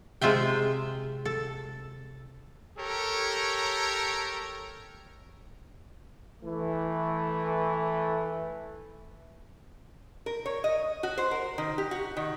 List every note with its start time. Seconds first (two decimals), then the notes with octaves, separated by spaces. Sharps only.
0.21 C3 G#3 F4 E5 G5
1.25 A4
2.78 G4 A4 A#4 C#5
6.43 E3 A3
10.26 A#4
10.46 C#5
10.64 D#5
11.03 F#4
11.18 C5
11.31 A#4
11.58 D#3
11.78 G4
11.91 F#4
12.17 D#3